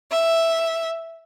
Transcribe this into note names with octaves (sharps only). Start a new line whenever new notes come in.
E5